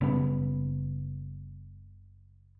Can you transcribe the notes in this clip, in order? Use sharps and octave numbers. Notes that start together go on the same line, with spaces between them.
F#1 C#3 G3 B3